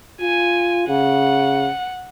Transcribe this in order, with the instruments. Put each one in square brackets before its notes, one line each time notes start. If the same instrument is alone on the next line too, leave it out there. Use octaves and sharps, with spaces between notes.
[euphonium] F4 [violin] G#5
[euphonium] C#3 [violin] F#5